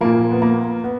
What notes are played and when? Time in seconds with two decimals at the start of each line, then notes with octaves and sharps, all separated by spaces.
0.01 A#2 F3 A#3
0.31 B3
0.42 A#3
0.84 B3